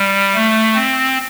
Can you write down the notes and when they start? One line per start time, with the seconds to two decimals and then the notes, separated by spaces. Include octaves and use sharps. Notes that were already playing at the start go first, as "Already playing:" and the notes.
Already playing: G3
0.35 A3
0.75 C4